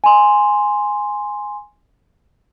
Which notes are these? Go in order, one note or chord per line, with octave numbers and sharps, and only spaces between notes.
G#5 C6